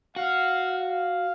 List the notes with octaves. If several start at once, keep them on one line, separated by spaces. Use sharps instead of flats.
F#4 F5
F5